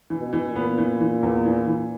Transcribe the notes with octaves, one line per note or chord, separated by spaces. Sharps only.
E3
B2
E3
A#2
B3
E3
E3
E2
E3
E3